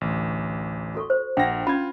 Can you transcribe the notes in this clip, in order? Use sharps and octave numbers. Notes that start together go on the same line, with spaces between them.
A1 D2
F#4 A4 C#6
C5
A#1 D4 F#5 G5 A#6
C#4 F4 B5 G#6